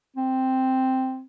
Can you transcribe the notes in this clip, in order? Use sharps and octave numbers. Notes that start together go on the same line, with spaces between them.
C4